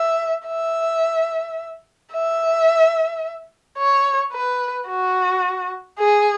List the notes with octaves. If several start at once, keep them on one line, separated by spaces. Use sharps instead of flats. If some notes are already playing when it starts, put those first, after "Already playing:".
Already playing: E5
E5
E5
C#5
B4
F#4
G#4